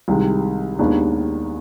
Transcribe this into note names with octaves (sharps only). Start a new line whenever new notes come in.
C2 C3 D#3 G#3
D#2 D#3 G#3 B3 D4